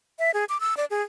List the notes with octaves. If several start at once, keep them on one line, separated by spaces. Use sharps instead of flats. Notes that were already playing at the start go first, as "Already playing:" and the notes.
E5
G#4
D6
E6
D5
G#4